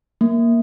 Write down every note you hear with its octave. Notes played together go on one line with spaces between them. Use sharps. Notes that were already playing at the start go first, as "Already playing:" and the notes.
A#3